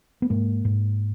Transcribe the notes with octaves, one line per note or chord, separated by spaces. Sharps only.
B3
G#2 A#3
G#2